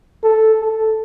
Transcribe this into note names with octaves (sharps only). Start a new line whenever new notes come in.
A4
A4